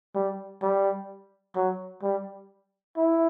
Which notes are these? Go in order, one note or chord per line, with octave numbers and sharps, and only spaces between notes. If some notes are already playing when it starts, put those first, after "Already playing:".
G3
G3
F#3
G3
E4